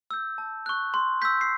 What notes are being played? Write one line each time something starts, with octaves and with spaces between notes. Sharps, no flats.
E6 G6
A5
C#6 F#6
C6
E6 G6 B6
C7